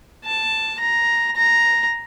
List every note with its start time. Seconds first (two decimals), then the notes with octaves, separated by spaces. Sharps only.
0.25 A5
0.80 A#5
1.36 A#5